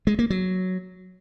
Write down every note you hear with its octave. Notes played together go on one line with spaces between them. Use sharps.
G#3
A#3
F#3